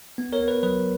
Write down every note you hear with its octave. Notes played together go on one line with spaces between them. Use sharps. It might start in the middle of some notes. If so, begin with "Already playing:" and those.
B3
A#4 C#5
B3
B4
F#3 B4